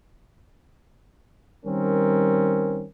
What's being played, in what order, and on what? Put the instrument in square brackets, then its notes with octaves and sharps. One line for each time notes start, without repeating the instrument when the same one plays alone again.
[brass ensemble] D#3 G3 C4 C#4 A#4